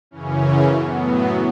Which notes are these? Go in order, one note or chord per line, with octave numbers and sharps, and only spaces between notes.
F#2 C#3 E3 C#4
A2 F#3 B3